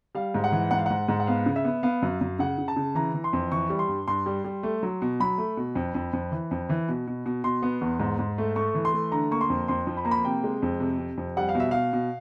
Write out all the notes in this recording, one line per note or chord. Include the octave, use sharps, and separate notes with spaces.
G3 F5
G#2
F#5
E3
G#2 F#5
F5
G#2 F#5
G#2
F#5
B3 F5
C#3
E5
B3
B3 F5
F#2
F#2
C#3 F#5
C#3
A5
C#3
E3 A#5
E3
C6
F2
E3 C#6
G3
C6
G2
G2 C6
G3
G3
A3
F#3
B2
F#3 B5
A3
B2
F2
F2
F2
E3
F2
E3
B2
B2
B2
B2 C6
B3
E2
G#2
G#2
A3
A3 C#6
E3
C6
A3
D3 A#5
A#3 C#6
C6
F2
F2 C6
F3
B5
A#3 A#5
B5
C3 G5
G#3
F2
C3
C3
F2
G3 F#5
F5
B2
E5
B2 F5
B2